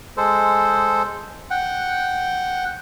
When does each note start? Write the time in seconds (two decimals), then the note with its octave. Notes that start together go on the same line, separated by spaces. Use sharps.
0.17 G#3 A4 C5
1.51 F#5 G5